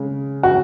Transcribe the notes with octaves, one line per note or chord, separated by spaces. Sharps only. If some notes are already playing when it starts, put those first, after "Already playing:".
Already playing: C#3 G#3
F#4